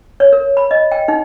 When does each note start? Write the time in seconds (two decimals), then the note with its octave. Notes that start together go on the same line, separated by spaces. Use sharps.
0.20 C#5
0.33 A#4
0.57 B5
0.71 D#5
0.92 G5
1.08 D#4